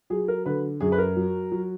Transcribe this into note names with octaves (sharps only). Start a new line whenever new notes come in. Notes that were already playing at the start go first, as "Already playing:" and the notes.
F#3 G#4
A#4
D3 B4
F#2 G#4
B4
A#4
F#3
F#3